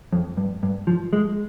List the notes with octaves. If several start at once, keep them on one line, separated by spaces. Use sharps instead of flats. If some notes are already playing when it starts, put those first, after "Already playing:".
F2
G2
G2
F3
G#3